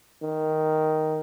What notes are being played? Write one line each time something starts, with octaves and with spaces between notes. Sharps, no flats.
D#3